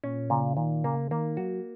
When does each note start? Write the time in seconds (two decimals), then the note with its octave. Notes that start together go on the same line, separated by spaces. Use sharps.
0.03 A#2 C#4
0.30 A#2 C#3
0.57 A#2 D#3
0.84 C#3 A#3
1.11 D#3 A#3
1.37 F#3 F#4